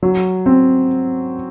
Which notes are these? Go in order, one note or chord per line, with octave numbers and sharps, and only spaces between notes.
F#3
C4